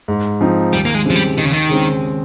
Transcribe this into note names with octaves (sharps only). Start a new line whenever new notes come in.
G#2
F3 C4 D#4
D#2 G3
A#3
G#3
C#3 F3 G#3 C4 G4
G3
D#2 D#3
C#3
D#3
C#3 G#3 C4